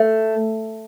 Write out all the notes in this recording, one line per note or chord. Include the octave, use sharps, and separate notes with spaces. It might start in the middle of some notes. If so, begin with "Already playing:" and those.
Already playing: A3